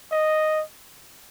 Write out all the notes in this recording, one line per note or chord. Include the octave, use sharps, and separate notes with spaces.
D#5